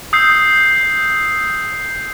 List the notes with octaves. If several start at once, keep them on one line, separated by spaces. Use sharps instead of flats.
D#6 E6 G6 C7